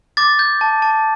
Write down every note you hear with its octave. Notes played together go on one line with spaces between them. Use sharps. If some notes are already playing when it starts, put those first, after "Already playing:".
D6 A6
G6
A5
A5